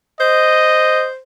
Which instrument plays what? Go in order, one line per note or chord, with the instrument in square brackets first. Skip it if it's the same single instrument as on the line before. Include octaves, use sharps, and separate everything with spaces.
[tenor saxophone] C5 [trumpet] D#5